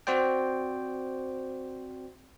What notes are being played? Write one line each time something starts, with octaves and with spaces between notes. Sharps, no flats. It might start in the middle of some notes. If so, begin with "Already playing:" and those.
C4 F#4 C5 D5 G5